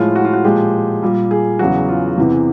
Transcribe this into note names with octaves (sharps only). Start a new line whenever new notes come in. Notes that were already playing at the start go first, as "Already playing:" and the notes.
Already playing: A2 F3 G#3 F4
F#4
F4
F#4
A#2 F3 G#3 G4
A#2 G3
G#4
E2 C#3 F#3 F#4
F4
E2 C3 E3